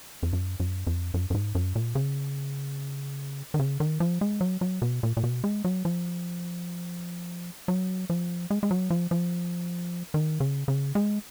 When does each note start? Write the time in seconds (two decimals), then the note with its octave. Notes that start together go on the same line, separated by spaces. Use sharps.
0.23 F2
0.33 F#2
0.60 F#2
0.87 F2
1.14 F#2
1.30 F#2
1.34 G#2
1.55 F#2
1.75 A#2
1.95 C#3
3.54 D#3
3.59 C#3
3.80 D#3
4.00 F3
4.21 G#3
4.41 F#3
4.61 F#3
4.82 B2
5.03 A#2
5.17 A#2
5.23 B2
5.44 G#3
5.65 F#3
5.85 F3
7.68 F#3
8.10 F3
8.50 G#3
8.63 G#3
8.71 F#3
8.90 F3
9.11 F3
10.14 D#3
10.40 C#3
10.68 C#3
10.95 G#3